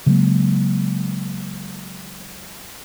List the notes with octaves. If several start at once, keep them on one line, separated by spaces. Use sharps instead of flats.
C#3 F#3 G#3 A#3